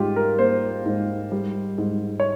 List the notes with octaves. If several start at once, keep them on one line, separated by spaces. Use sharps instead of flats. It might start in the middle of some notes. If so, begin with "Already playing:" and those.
Already playing: G#2 G3 F4 G4
A#4
A#3 C5
G#2
G3
G#2
C#5